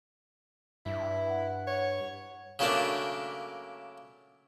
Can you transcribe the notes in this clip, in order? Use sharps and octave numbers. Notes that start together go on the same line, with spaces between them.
G2 E4
F#5
C#5
C#3 F#3 A3 A#3 D4